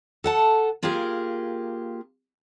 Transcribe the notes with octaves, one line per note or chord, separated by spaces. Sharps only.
A4 F#5 A5
A#3 F4 G4 G#4 A#4